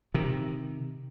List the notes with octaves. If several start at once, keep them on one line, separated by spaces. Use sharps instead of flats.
C3 D#3